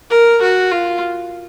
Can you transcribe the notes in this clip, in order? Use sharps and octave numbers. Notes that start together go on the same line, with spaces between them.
A#4
F#4
F4